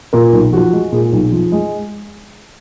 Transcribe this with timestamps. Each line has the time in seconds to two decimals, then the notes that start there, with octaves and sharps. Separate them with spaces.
0.13 A#2 A#4
0.33 B1
0.53 F3 F#4
0.73 G#3
0.92 A#2 G#4
1.13 B1
1.32 F3
1.52 G#3